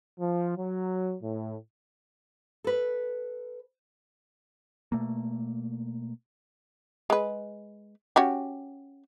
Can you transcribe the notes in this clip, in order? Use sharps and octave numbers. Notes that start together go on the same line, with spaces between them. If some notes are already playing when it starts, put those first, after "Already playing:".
F3
F#3
A2
A4 B4
B2 A3 A#3
G#3 B4
C#4 F#4 G4